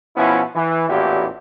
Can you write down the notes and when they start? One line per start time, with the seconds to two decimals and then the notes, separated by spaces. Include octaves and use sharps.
0.16 B2 F3 B3 C#4 E4
0.55 E3
0.89 A1 E2 A#2 E4 F#4 G4